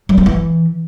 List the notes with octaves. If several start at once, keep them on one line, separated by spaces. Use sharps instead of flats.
F#3
C4
E3